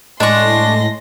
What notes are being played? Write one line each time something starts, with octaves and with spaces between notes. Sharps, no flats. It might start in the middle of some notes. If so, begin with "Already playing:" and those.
A2 G#3 D4 C6 C#6 A#6